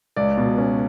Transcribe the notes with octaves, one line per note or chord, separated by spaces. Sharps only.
C#2 D5
B2
C#4